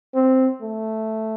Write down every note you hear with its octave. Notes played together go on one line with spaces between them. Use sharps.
C4
A3